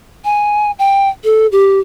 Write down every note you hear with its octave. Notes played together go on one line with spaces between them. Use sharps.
G#5
G5
A4
G4